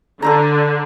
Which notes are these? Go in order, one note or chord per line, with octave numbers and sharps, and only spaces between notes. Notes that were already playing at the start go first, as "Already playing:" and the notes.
D3 A4 C5 A#5